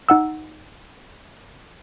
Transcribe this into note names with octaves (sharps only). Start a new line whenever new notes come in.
D#4 F#5 E6